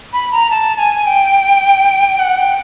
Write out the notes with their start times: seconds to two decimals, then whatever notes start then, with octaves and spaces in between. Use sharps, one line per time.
0.13 B5
0.32 A#5
0.51 A5
0.78 G#5
1.07 G5
2.19 F#5
2.38 G5